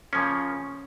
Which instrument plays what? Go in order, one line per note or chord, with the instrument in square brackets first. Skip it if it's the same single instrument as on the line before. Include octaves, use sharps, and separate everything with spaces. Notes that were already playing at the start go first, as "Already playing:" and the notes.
[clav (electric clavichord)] C#3 F3 A#3 C#4